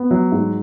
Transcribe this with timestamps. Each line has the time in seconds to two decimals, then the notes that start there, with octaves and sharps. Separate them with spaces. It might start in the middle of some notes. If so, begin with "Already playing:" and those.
Already playing: B3
0.11 F#3
0.32 G#2